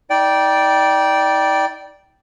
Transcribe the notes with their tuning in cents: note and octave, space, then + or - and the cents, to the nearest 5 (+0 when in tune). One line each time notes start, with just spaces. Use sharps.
D#4 +40 D5 +0 G5 -10